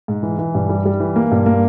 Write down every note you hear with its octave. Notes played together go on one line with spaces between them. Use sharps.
G#2
E3
E3
G2
G3
G3
E3
A#3
G2
A#3